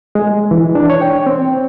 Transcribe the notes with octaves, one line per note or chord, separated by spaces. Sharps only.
G#3
E3
D4
C#5
G5
C4